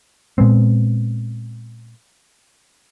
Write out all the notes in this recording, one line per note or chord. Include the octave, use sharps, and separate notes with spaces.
A#2 G#3 B3 C4